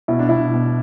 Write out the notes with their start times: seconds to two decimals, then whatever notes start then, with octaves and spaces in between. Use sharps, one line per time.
0.08 B2 E4
0.19 D4
0.29 B2 E4
0.54 B2